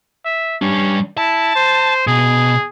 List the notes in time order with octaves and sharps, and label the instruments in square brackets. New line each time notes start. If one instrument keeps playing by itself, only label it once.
[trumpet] E5
[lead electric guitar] G3 D4 [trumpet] C#4
[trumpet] E4 [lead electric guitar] A5
[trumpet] C5
[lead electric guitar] B2 [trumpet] G#4